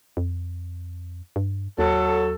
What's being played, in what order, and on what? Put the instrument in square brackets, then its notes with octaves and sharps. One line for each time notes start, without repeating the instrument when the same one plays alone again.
[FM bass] F2
G2
[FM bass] D#2 [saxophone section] F#3 A4